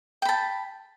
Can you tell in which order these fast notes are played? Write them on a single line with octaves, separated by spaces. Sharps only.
G5 B5 A5